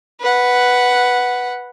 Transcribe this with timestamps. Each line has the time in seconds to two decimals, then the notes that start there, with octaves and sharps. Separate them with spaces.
0.21 B4 F#5